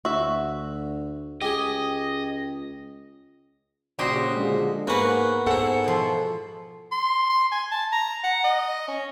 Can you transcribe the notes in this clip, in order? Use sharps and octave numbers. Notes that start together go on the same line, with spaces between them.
D2 F#4 E5
C#2 G4 G#4 D#5
A#1 C#3 F#4 G4 C5 D#5
D3 F3 G#3
G#2 A#3 B3 F#4 A#4 B4 F#5
G#2 E4 A4 C5 F#5
B2 F3
C6
C6
G#5
A5
A#5
F#5
D#5
C#4